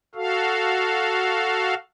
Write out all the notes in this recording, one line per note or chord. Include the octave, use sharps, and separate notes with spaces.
F#4 A4 F5